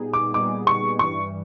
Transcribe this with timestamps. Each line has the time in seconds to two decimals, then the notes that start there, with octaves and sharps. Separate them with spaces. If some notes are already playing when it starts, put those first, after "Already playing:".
Already playing: A#2 G3 B3 D#4 G#4
0.14 D6
0.34 A#2 G3 B3 D#4 G#4 D6
0.67 C#6
0.99 G2 E3 G3 C#6